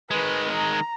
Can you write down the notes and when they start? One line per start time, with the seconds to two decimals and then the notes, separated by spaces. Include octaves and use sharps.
0.11 D#3 G#3 B4
0.53 A#5